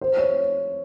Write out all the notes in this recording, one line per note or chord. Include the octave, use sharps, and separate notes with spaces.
C5
C#5